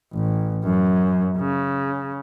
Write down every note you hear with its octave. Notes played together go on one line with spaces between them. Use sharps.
A1
F#2
C#3